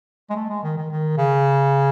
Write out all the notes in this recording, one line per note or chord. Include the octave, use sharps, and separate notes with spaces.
G#3
A3
G#3
D#3
D#3
D#3
C#3